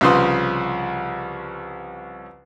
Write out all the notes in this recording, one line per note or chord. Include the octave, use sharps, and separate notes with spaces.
C2 C#3 F3 B4 C6 D#6